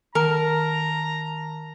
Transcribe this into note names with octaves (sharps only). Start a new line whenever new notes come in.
D#3 A#4 A5 A#5